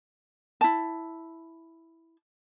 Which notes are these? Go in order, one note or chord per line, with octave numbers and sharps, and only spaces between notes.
E4 A5